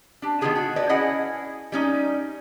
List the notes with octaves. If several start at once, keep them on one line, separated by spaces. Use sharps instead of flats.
D4 G4
D#3 B3 F4 G4 G#4 A5
F#4
B4 C5 D5 D#5
C#4 E4 G#4 D#5 F#5 G#5
G3 C#4 D#4